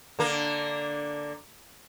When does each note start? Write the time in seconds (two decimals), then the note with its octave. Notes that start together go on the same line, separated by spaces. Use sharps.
0.19 D3 A#3